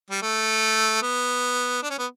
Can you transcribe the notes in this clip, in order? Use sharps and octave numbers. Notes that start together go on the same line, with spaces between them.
G3
A3
B3
D4
C#4
B3